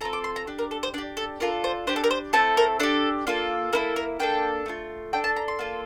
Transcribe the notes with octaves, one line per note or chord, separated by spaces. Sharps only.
C4 F4 A4 A#5
D6
C6
A#5
D4 G4
A#4
A4
C5
D4 G4 D5
A4
D4 F4 A4 A#4
C5
D4 G4 C5
A4
A#4
C5
A3 C4 E4 A4 A5
A#4
D4 G4 A4
A#3 F4 A4
A#3 E4 A4 A#4
A#4
A#3 D4 A4 G5
A3 D4 F4
D4 A4 G5
A5
A#5
C6
A#3 F4 A4